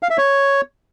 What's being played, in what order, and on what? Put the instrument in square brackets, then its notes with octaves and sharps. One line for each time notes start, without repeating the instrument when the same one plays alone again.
[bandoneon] F5
E5
C#5